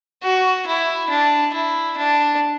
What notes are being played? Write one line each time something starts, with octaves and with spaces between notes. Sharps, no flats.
F#4
E4
D4
E4
D4